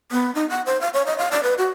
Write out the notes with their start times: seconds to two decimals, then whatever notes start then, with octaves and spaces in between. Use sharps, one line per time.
0.12 B3
0.35 D#4
0.50 F#5
0.66 C5
0.81 F5
0.94 C#5
1.06 D#5
1.18 F5
1.31 D5
1.43 B4
1.58 F#4